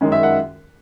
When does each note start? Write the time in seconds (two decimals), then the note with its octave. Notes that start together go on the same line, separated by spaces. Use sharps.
0.01 F#2 D#3 G#3 C#4
0.12 E5
0.23 F#5